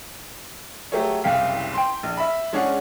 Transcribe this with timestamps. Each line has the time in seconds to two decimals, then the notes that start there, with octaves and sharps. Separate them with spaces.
0.92 F#3 A3 G4 G#4 C#5
1.24 F#1 C2 F5 G5 B6
1.73 G5 C6
2.03 A#1
2.17 E5 B5
2.53 G#3 C#4 D4 G#4 C#5 F#5